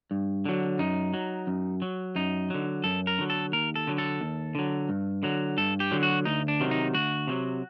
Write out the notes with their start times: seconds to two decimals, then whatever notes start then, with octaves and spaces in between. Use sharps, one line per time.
0.11 G2
0.45 D3 F#3
0.79 F#2 D#4
1.14 F#3
1.47 F#2
1.82 F#3
2.15 F#2 D#4
2.50 D3 F#3
2.84 F#2 A4
3.07 A#4
3.18 D3 F#3
3.30 A4
3.52 D#2 A#4
3.76 A4
3.87 D3 F#3
3.98 A4
4.21 D#2
4.55 D3 F#3
4.89 G2
5.23 D3 F#3
5.57 G2 A4
5.80 G4
5.91 D3 F#3
6.03 F#4
6.25 D2 D#4
6.48 D4
6.60 C3 D#3 F#3
6.71 D#4
6.94 D2 F#4
7.28 C3 D#3 F#3